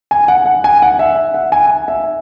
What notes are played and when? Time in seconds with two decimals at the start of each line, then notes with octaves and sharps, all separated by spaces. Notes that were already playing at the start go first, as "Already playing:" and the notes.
0.11 G#5
0.28 F#5
0.46 F#5
0.64 G#5
0.82 F#5
0.99 E5
1.34 F#5
1.52 G#5
1.88 E5